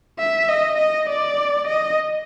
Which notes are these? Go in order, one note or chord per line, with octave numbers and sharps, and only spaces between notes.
E5
D#5
D#5
D5
D#5